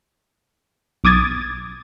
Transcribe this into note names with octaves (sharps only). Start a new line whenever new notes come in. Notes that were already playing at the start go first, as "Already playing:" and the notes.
B1 D6 D#6 G#6 A6